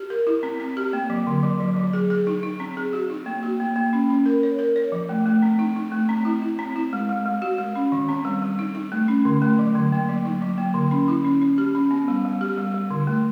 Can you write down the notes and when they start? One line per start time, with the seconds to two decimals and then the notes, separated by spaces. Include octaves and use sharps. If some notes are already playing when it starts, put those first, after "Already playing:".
Already playing: G4
0.10 A#4
0.27 E4
0.43 C4
0.60 C4
0.77 G4
0.93 A#3
1.10 F#3
1.27 D3
1.43 F#3
1.60 F#3
1.76 F#3
1.93 G#4
2.10 G#4
2.27 D#4
2.43 D#4
2.60 C4
2.77 G#4
2.93 F#4
3.10 D#4
3.26 A#3
3.43 F#4
3.60 A#3
3.76 A#3
3.93 C#4
4.10 C#4
4.26 A#4
4.43 C#5
4.59 A#4
4.76 C#5
4.92 F3
5.09 A3
5.26 A3
5.42 C4
5.59 D#4
5.76 D#4
5.92 A3
6.09 C4
6.25 E4
6.42 E4
6.59 C4
6.76 E4
6.93 G#3
7.09 G#3
7.26 G#3
7.42 F#4
7.58 G#3
7.76 C#4
7.92 D#3
8.09 C4
8.25 G3
8.42 G3
8.59 D#4
8.75 D#4
8.92 A3
9.08 C#4
9.25 D3
9.42 A3
9.59 F#3
9.75 D3
9.92 A#3
10.09 F#3
10.25 D#4
10.42 F#3
10.58 A#3
10.74 D3
10.91 C#4
11.08 E4
11.25 C#4
11.42 C#4
11.58 G4
11.75 C#4
11.91 B3
12.08 G3
12.25 G3
12.41 G4
12.58 G3
12.74 G3
12.91 D3
13.07 A3